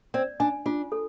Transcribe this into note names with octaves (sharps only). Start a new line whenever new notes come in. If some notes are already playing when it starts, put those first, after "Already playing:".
C4 D5
D4 G#5
D4 F4
A4